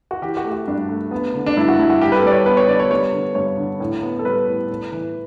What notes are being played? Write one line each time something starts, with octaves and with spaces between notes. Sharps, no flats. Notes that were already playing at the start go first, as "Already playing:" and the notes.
F#4
E3 G4
F#4
A3
F#4
G2 D4
A3
B3
D3
D4
G2 E4
F#4
G2 E4
F#4
G3 G4
B4
A4
G3 D5
C#5
B3 B4
C#5
D3 D5
C#5
G3 C#5
D3
G2 C#5
D3
A2
B3
A4
G3 B4
A2
A2
E3